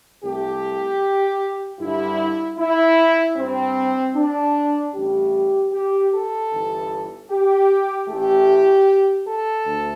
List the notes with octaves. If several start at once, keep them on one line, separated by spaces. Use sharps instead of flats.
C2 C3 A3 G4
G2 D3 G3 E4
E4
G2 G3 C4
D4
A1 A2 G3 G4
G4
A4
G1 G2 E3
G4
A1 A2 E3 A3 G4
A4
D2